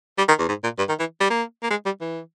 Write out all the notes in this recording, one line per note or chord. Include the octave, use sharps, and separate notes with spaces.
G3
D#3
E2
G#2
A#2
G2
D#3
E3
G3
A#3
A#3
G#3
G3
E3